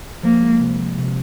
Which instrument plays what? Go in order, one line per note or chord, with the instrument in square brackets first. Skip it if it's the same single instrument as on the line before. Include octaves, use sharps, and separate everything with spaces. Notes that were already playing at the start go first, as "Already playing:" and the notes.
[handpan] F3 [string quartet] A#3
[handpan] G#3
C3
F3
C3